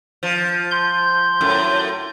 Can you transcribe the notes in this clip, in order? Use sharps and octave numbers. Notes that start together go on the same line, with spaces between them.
F3
C6 G6
F#2 A2